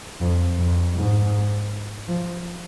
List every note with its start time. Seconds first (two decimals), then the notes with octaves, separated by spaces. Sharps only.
0.21 F2
0.58 F2
0.96 G#2
2.08 F3